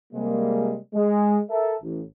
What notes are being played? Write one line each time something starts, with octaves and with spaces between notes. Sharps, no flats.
C3 G3 G#3 A#3
G#3
A4 A#4 E5
A1